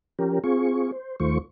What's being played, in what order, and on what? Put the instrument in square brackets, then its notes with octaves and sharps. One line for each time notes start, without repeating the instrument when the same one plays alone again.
[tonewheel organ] F3 C#4 G4 A#4
C4 F4 G#4 C#6
C5
D#2 D#3 A3 F4 C5 C#6